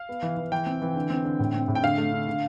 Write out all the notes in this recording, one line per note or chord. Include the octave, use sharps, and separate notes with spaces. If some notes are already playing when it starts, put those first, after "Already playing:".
Already playing: F5
B3
E3
E3
E3 G5
C4
E3
D3
C4
D3
A2
C4
A2
G5
D3 F5
A3
D3
D3